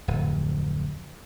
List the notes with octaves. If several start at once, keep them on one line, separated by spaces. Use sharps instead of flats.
D1 F2